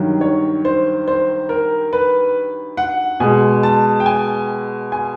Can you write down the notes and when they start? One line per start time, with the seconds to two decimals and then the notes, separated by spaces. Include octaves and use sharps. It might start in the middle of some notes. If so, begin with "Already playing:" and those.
Already playing: G2 D#3 F#3
0.21 C#5
0.65 C5
1.08 C5
1.49 A#4
1.93 B4
2.77 F#5
3.20 B2 G#3 G#5
3.63 A5
4.00 G5
4.06 G#5
4.92 G#5